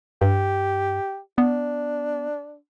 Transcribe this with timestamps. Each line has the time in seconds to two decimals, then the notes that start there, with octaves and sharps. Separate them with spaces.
0.22 G2 G4
1.38 B3 D4